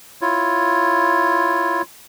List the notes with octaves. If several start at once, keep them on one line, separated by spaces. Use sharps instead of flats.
E4 F4 C#5